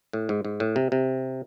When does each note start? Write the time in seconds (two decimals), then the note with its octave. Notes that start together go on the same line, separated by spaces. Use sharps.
0.13 A2
0.29 G#2
0.45 G#2
0.60 A2
0.76 C3
0.92 C3